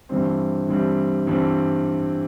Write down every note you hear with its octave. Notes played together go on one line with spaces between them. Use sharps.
G2 E3 G3 C4
G2 E3 G3 C4
G2 E3 G3 C4